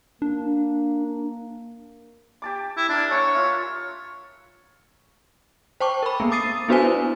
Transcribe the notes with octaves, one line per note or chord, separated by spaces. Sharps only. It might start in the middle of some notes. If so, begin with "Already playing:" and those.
A#3 D4
G4 A5 D6
E4
D4 E4 A#4
C#5 F#5 G#5 A5
F4 A#4 E5
C5 G5 A5 C#6 D6
A#4 B5
A#3 B3
D6 D#6 A6 C7 D#7
B3 D4 F#4 B4 C5 G#5
E4